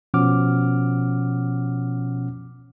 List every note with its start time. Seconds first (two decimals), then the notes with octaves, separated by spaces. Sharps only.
0.14 B2 F3 C#4 F#5 D6 F6